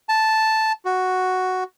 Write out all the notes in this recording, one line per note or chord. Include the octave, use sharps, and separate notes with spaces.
A5
F#4